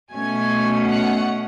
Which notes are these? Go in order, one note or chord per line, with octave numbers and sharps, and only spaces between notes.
B2 A3 C#4 G#5
F#5